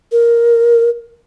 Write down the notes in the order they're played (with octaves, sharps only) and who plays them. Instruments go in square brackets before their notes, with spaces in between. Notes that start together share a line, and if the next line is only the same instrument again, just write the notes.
[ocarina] A#4